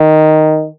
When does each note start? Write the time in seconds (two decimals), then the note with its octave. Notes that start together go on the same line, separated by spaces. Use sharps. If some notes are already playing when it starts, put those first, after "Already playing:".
Already playing: D#3